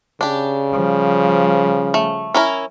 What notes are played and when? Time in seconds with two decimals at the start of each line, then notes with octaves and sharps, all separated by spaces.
0.21 C#3 D4 G4
0.71 F3 G3
1.94 A3
2.34 C#4 E4 A#4